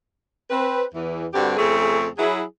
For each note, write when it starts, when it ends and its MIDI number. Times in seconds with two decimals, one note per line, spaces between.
0.50 0.84 60
0.50 0.84 71
0.95 1.26 40
0.95 1.26 52
1.33 1.56 43
1.33 1.56 50
1.33 1.56 55
1.33 1.56 60
1.33 1.56 66
1.33 1.56 67
1.57 2.07 41
1.57 2.07 49
1.57 2.07 57
1.57 2.07 60
1.57 2.07 68
2.18 2.42 54
2.18 2.42 64
2.18 2.42 68